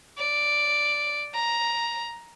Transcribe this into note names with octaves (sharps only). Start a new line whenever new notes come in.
D5
A#5